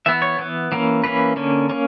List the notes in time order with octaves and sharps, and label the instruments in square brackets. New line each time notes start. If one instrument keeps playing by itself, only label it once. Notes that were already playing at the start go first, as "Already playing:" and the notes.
[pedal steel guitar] E3 B3 E5
C#5
E3 B3
E3 A#3 C#4
E3 A#3 C#4 B4
D3 A#3 C#4
A#3 C#4